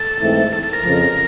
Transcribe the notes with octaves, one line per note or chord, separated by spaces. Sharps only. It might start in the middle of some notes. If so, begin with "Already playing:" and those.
Already playing: A4
G#2 E3 A3 C4 E4
A4
A4
A#4
F2 C#3 F3